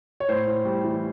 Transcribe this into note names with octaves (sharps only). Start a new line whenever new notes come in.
C#5
A2 C5
A2
G3
E3